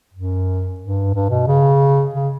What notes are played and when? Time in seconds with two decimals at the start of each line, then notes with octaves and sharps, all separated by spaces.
0.14 F#2
0.80 G2
1.14 G2
1.30 B2
1.48 C#3
2.14 C#3